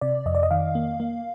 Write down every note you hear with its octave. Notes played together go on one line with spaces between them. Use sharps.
C3 D5
F2 D#5
D5
D#5
D#3 F5
A#3
A#3